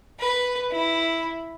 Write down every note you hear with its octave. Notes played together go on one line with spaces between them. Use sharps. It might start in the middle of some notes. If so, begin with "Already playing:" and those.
B4
E4